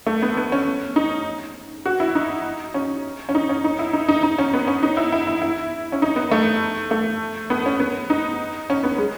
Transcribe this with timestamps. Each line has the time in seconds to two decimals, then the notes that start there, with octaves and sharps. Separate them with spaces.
0.07 A3
0.22 B3
0.37 B3
0.52 C#4
0.96 D#4
1.86 F#4
2.00 E4
2.15 D#4
2.74 C#4
3.29 C#4
3.35 D#4
3.49 C#4
3.64 D#4
3.79 E4
3.93 D#4
4.08 D#4
4.23 D#4
4.38 C#4
4.54 B3
4.67 C#4
4.83 D#4
4.97 E4
5.12 E4
5.27 E4
5.42 E4
5.92 C#4
6.02 D#4
6.16 B3
6.31 A3
6.91 A3
7.50 B3
7.66 C#4
7.80 B3
8.10 D#4
8.70 C#4
8.83 B3
8.98 G#3